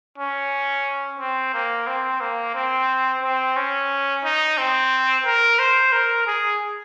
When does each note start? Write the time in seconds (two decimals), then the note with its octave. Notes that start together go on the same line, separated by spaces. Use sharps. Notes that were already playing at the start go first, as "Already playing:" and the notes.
0.18 C#4
1.19 C4
1.54 A#3
1.87 C4
2.21 A#3
2.54 C4
3.23 C4
3.57 C#4
4.24 D#4
4.58 C4
5.25 A#4
5.59 C5
5.93 A#4
6.27 G#4